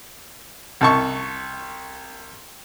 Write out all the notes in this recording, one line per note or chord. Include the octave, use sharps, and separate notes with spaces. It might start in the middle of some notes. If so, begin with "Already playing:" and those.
C2 A5 C#6